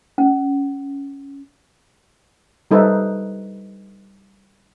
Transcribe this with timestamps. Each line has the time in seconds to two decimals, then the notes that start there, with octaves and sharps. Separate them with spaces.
0.18 C#4
2.71 G3 D#4 A4 B4 C5 E5